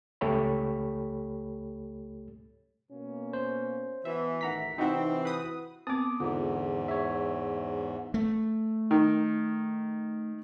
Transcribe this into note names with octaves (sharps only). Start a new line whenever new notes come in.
C#2 A3 G4 A4 C#5 B5
B2 A#3 C#4
C5
B2 E3 E5
A1 D#3 F#5 A#5 B6
C3 E3 C4 D#4 E4 F#4 E5 F#5
B4 D#6
B3 C4 D6 D#6
E2 G#2 D3 F4
C#5 E5
A3
D#3